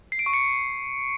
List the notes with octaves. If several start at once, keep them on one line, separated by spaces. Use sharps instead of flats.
C7
D7
C#6
C#7